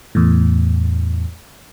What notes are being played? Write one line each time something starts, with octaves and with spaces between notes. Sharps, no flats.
E2 A2